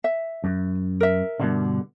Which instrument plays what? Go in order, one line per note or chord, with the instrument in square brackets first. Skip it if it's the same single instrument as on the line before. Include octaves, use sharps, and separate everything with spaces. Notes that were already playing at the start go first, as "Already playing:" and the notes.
[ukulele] E5
[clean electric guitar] F#2
[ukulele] A#4 E5
[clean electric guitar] G2 B2 D3